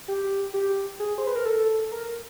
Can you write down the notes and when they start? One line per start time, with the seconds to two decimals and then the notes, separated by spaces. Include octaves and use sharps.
0.08 G4
0.54 G4
1.00 G#4
1.18 C5
1.27 B4
1.36 A#4
1.46 A4
1.92 A#4